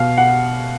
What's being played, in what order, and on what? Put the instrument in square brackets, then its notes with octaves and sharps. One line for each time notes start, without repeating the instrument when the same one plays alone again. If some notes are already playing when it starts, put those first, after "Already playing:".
Already playing: [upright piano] B2 F5
F#5